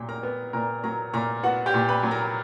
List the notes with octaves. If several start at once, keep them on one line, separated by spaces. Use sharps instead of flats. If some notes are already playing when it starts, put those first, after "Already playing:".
Already playing: A#2 F#3 G4 G5
A#4 A#5
B3
A#2 A#4 A#5
F#3 A#4 A#5
A#2 A#4 A#5
B3 F#4 F#5
G4 G5
A#2
B4 B5
F#3
A#4 A#5